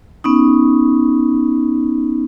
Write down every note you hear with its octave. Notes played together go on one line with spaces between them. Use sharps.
B3 C#4 D#4